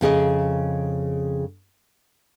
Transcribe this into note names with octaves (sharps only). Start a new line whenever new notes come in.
F2 C#3 G#4 D#5